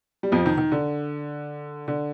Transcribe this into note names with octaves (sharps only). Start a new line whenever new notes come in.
G3
F2 F3
D#3
D#3
D3
D3